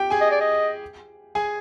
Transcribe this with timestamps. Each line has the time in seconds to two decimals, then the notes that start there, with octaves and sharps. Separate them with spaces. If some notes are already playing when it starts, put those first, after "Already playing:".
Already playing: G4 G5
0.10 G#4 G#5
0.21 D#5
0.31 D5
0.41 D#5
1.35 G#4 G#5